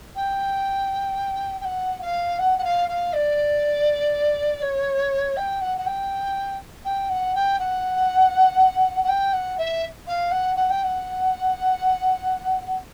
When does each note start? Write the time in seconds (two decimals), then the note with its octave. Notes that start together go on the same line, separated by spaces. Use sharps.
0.15 G5
1.60 G5
1.64 F#5
2.01 F5
2.38 F#5
2.58 F#5
2.64 F5
2.89 F5
3.13 D5
4.62 C#5
5.36 G5
5.61 F#5
5.78 F#5
5.86 G5
6.85 G5
7.09 F#5
7.35 G5
7.59 F#5
9.04 F#5
9.08 G5
9.33 F#5
9.58 E5
10.07 F5
10.31 F#5
10.56 F#5
10.70 G5
10.83 F#5